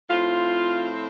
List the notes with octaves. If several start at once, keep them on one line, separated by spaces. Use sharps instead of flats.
A2 F3 C4 F4